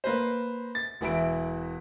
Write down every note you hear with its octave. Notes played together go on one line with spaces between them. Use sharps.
A#3 B4 C5
A6
E1 E3 E4 D7